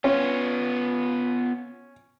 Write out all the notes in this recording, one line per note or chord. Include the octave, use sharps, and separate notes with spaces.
B3 C#4 F4